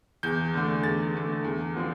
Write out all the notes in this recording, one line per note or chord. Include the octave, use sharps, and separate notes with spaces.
E2 G6
D3 A3
E2 A6
D3 A3
E2
D3 F3 C4